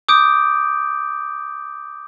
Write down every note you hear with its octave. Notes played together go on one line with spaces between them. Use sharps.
D6 D#6 G6 D7